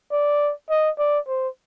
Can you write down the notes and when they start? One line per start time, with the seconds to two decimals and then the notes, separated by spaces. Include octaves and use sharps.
0.12 D5
0.70 D#5
0.99 D5
1.28 C5